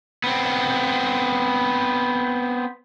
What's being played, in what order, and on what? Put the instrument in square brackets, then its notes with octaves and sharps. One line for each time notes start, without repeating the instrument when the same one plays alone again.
[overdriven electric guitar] B3 C4